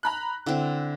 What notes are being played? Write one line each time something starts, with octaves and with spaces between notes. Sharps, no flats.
A#5 B5 F#6
D3 C4 E4